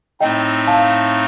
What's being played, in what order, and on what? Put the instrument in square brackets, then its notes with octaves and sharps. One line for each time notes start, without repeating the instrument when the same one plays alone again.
[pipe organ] A2 A3 C4 D#4 [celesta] D#5 G5
[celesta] F5 A5